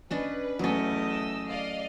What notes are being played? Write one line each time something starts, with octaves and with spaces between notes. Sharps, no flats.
C#4 D4 B4 D#5
E2 F#3 A3 C#4 D#5
E6
D5 D#5 F5